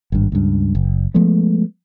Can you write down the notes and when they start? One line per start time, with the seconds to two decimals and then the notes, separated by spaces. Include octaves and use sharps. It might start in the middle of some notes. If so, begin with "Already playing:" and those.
0.12 G#1 G2
0.32 C#2 G2
0.75 F#1
1.14 F3 G#3 A3 B3